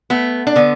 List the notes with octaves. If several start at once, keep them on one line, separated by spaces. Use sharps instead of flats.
A3 B3
D4
D3 B3